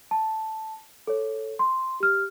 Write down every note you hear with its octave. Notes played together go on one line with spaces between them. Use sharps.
A5
A4 C#5
C6
G4 F6